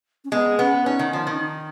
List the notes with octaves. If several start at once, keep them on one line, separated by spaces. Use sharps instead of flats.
C#4
G#3 B3
B3 C#4
C#4 D#4
D#3
F3
D#3
C#4
D#4